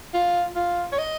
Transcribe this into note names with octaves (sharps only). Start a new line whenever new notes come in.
F4
F4
C#5
D#5